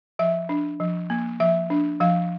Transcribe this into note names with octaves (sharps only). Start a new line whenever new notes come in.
F3 E5
D4
F3
A#3
F3 E5
D4
F3 F5